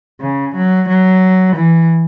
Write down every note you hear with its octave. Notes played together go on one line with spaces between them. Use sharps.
C#3
F#3
F#3
E3